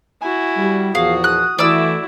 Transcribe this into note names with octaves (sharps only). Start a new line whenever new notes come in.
E4 F#4 G#5
G3
E2 A#2 F3 F#4 G#4 F5
D#6 F#6
E3 A3 E4 F#4 D5 E6